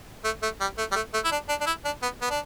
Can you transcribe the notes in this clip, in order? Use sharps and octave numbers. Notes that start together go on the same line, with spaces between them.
A3
A3
G3
A3
G3
A3
A3
E4
D4
D4
D4
E4
D4
B3
B3
D4